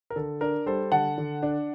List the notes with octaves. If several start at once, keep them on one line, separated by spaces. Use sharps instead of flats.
A#4
D3 A4
D4 A#4
G3 A4 C5
D3 F#5 A5
D3
D4